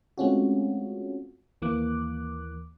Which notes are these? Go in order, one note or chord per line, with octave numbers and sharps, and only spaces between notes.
G#3 A3 C4 C#4 F4 F#4
D#2 E3 A#3 D6 F#6